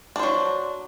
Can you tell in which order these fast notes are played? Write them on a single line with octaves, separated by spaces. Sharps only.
D4 C5 F#3